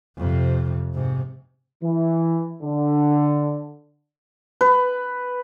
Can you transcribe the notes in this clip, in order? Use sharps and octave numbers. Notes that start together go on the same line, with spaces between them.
F2 C3
G#2 C3
E3
D3
B4